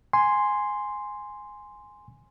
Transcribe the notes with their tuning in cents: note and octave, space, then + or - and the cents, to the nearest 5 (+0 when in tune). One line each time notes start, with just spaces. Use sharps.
G#5 +0 C6 +0